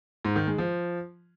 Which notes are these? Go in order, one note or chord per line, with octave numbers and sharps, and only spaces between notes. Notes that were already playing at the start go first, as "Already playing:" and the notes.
G#2
D#3
G#3
F3